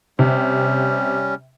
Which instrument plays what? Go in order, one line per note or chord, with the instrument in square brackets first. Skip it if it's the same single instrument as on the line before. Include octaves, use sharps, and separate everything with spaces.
[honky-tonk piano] C3 [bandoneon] G3 C#4